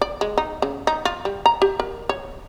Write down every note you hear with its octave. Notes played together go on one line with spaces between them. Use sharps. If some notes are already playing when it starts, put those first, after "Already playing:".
D5
G#3
D#4
C#3
D#4
F4
G3
A#5
G4
A#4
C#5